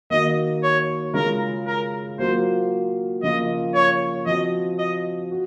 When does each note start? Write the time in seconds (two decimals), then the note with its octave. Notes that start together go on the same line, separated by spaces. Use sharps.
0.10 D#3 A#3 D#4 F#4 D#5
0.63 C#5
1.14 C#3 G#3 C#4 F4 A#4
1.66 A#4
2.18 F#3 A#3 F4 C5
3.22 C#3 F3 A#3 F4 D#5
3.74 C#5
4.26 F3 C4 F#4 D#5
4.79 D#5
5.31 F#4